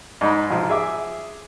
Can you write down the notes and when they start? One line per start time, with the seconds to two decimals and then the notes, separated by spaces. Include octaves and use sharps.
0.21 G#2 D#4 B5
0.50 B1 F3
0.69 G#4 E5 D6